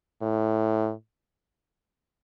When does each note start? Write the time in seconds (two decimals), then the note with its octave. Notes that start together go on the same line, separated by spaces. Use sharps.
0.22 A2